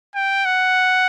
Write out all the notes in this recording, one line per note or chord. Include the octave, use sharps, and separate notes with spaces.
G5
F#5